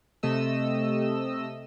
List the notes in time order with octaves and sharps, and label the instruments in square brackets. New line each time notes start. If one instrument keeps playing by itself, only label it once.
[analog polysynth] C3 A3 D#5 E6